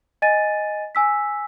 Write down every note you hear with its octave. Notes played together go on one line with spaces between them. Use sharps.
D#5 G#5 A6 D#7
G#5 E6 B6